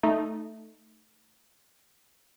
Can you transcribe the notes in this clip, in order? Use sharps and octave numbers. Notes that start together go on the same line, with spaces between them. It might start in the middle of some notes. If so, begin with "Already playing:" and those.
A3 D#4